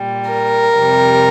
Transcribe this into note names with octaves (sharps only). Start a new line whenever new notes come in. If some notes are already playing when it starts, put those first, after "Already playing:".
Already playing: A#2 G3
A#4
F2 C3 G3